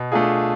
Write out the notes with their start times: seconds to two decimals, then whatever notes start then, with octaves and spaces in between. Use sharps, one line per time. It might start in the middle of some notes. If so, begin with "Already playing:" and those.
Already playing: B2
0.12 A3 D4 F4 G#4